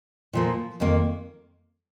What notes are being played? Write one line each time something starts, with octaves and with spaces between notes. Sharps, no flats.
A#2 F3 A#3
F2 D#3 A#3